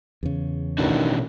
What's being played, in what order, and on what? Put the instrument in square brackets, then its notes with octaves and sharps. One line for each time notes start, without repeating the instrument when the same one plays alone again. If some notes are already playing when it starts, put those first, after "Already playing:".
[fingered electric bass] E2 C#3
[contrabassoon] A1 [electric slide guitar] B2 D4 F#4 [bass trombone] D#3